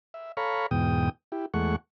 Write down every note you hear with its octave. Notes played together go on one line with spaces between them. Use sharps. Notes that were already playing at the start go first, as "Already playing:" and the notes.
E5
A4 C#5 F5 A#5 B5 C#6
E2 G#2 B2 G5 D#6
E4 G4
E2 G#3 A3 F#5 C#6